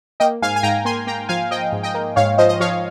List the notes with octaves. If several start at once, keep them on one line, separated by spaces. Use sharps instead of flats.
A#3 D#5 G5
G#2 F5 G#5
G#5
G#2 G5 A#5
A#3 G#5 C6
A#3 G5 A#5
F3 F5 G#5
F3 D#5 G5
G#2
D#5 G5
A#3
G#2 C#5 F5
F3 C5 D#5
D#5
F3 C#5 F5